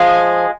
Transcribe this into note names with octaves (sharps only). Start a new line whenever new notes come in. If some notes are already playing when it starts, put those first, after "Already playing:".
Already playing: F3 G#3